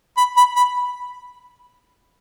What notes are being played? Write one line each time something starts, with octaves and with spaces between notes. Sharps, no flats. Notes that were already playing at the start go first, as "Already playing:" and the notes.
B5
B5
B5